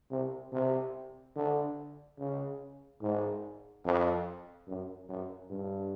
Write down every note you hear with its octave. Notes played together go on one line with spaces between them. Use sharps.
C3
C3
D3
C#3
G#2
F2
F#2
F#2
G2